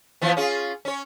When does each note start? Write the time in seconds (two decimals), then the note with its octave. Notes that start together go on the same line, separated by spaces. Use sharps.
0.22 E3 F3 B3
0.37 C#4 F4 G#4
0.85 C#4 C#5